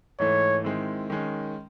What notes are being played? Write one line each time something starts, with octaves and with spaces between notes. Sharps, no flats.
G#2 E3 A3 C#5
D#3 G#3 C4 E4
D#3 G#3 C#4